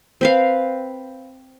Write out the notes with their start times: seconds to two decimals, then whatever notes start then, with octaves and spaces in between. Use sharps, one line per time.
0.21 C4 B4 F5